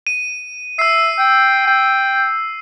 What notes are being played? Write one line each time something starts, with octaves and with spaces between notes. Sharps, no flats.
D#7
E5 E6 C7
G5
G5